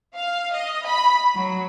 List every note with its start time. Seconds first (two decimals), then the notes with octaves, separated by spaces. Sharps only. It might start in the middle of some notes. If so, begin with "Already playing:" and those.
0.16 F5
0.54 D#5
0.86 B5
1.36 F#3